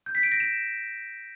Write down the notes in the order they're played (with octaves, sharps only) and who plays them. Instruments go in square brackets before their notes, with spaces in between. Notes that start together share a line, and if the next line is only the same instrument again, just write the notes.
[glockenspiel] G6
B6
D7
A#6
E7